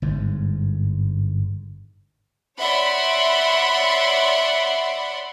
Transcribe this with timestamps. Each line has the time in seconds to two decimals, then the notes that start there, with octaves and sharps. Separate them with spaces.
0.02 G1 G#2
2.59 C#5 D5 E5 F#5 B5 C6